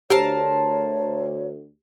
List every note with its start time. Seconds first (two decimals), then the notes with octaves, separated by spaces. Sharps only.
0.10 D2 G4 A#4 C5 C#5 A5